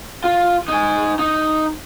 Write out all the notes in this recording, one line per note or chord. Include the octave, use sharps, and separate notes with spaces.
F4
D#4 G#5
D#4